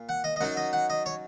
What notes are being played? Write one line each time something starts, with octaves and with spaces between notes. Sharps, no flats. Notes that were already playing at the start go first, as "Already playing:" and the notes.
Already playing: A#2
F#5
D#5
D#5
F#2 F#3 D#4 F#5
D#5
F#5
D#5
C#5